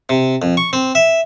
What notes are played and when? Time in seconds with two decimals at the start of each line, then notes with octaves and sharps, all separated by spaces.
0.09 C3
0.42 F2
0.57 C#6
0.73 C4
0.95 E5